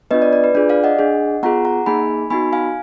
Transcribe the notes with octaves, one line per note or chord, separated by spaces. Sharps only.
B3 D4 F4 B4 D#5
D5
D5
B4
D4 F4 G#4 D5
D5 F5
D#5 F#5
D4 G#4
B3 F4 G#4 F#5 A#5
F#5 A#5
A#3 D#4 G#4 G#5 B5
B3 D#4 F#4 G#5 B5
F5 G#5